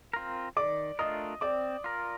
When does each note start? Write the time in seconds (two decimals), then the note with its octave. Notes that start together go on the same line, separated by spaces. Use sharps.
0.13 C4 F4 A#4
0.57 D#3 D5 D6
0.99 A3 D4 F4 A#4 D#5 D#6
1.41 C4 D5 D6
1.84 F4 A#4